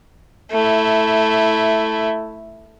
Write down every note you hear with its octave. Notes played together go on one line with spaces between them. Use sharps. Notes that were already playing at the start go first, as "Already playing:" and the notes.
A3 E4